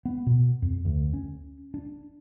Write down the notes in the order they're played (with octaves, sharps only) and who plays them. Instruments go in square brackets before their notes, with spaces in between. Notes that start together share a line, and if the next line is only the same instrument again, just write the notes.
[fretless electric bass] B3
B2
F2
D2
C#4
D4